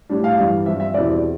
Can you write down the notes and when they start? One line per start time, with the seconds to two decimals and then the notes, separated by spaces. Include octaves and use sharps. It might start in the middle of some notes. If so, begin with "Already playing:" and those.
0.09 A2 G3 D4
0.24 F5
0.38 G2 E3 G3 D4
0.66 G2 F3 C4 E5
0.80 E5
0.94 E2 B2 G3 C4 E4 D5